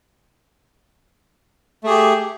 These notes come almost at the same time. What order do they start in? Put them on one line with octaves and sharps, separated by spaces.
A3 G#4 G4